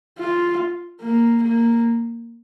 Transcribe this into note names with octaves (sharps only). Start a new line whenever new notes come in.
F4
A#3
A#3